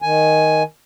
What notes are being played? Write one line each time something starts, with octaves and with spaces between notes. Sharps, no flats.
D#3 G#5